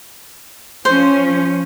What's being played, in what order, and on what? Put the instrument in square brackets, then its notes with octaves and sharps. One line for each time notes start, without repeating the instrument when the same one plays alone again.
[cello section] F3 C#4 [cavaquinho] C5